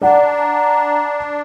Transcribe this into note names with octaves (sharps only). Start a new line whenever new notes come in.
D4 D5 F#5 A#5